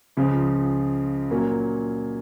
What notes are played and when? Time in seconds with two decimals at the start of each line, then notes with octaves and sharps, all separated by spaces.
0.17 C#2 C#3 F3
1.30 A#2 F#3 A#3 C#4